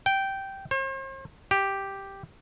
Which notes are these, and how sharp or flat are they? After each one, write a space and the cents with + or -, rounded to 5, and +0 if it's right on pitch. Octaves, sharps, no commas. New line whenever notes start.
G5 -10
C5 +45
G4 +0